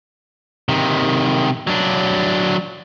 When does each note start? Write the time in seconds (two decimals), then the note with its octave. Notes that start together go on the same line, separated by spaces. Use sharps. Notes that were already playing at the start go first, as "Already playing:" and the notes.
0.69 C3 D#3
1.67 F#3 D4